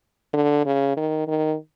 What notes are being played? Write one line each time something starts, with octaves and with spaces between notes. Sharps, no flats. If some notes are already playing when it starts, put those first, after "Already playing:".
D3
C#3
D#3
D#3